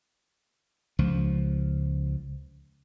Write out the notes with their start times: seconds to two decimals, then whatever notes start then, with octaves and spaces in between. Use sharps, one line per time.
0.99 C#2 F3